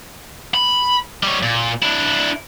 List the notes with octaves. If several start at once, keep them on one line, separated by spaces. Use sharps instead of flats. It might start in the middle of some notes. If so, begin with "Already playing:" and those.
B5
G3 C#5
A#2
D4 E4